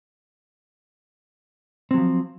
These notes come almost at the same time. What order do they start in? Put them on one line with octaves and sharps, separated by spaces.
C4 F#3 F3